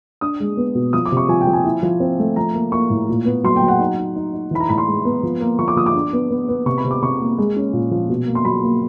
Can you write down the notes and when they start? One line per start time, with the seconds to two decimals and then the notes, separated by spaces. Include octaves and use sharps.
0.21 D4 D#6
0.40 G#3
0.57 B3
0.75 B2
0.93 F3 D#6
1.05 D6
1.12 C3
1.17 C#6
1.29 F3 G#5
1.41 G5
1.47 F3
1.53 G#5
1.64 E4
1.83 F3
2.00 C4
2.19 A3
2.36 F3 A#5
2.54 A#3
2.72 A#3 C#6
2.90 A2
3.09 A#2
3.25 B3
3.44 F#3 C6
3.56 G5
3.61 F#3
3.68 F#5
3.79 D#4
3.98 D#4
4.16 D#4
4.33 D#4
4.51 E3 B5
4.60 A#5
4.69 A2 B5
4.78 C6
4.87 G#3
5.05 B3
5.23 F3
5.40 A#3
5.59 F3 C#6
5.68 D6
5.76 F3 D#6
5.86 D6
5.95 D4
6.13 B3
6.31 B3
6.49 B3
6.66 C3 C#6
6.78 B5
6.84 C3
6.91 D6
7.02 C3 C#6
7.20 A#3
7.38 G#3
7.56 C#4
7.73 A#2
7.91 F3
8.09 B2
8.27 A#3
8.35 C6
8.45 F#3 B5
8.63 A#3